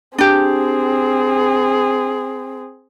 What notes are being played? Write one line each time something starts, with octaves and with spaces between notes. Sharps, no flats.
C4 D4 G4 G#4